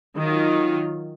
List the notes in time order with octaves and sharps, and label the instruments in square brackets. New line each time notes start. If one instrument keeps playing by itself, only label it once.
[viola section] D#3 F#3 F4